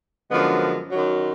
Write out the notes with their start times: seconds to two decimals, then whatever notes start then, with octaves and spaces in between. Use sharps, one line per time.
0.31 F#2 D3 F3 G#3 B3
0.91 F#2 D#3 F#3